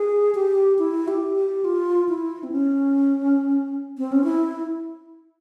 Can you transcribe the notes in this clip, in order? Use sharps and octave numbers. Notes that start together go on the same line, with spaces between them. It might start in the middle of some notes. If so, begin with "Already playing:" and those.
Already playing: G#4
G4
E4
G4
G4
F4
E4
C4
C#4
C4
C#4
E4